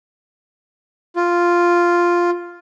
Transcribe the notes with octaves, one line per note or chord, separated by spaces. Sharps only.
F4